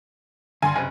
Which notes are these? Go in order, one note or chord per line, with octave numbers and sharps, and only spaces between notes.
G2 D3 G#5 C6
F#1 C3 C5 G#5